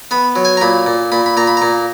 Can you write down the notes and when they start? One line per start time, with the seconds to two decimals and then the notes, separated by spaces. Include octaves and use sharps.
0.11 B3 B5
0.36 F#3
0.45 G#5
0.57 A#5
0.61 A#2 B5
0.86 A#2
1.12 A#2 B5
1.26 B5
1.37 A#2 A#5
1.47 B5
1.57 A#2 A#5